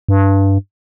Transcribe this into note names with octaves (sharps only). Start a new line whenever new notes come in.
G2